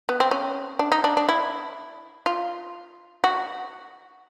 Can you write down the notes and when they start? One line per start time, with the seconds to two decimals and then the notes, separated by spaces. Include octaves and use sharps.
0.09 B3
0.20 C4
0.31 C#4
0.79 D4
0.92 D#4
1.04 D4
1.17 D4
1.29 E4
2.26 F4
3.24 F#4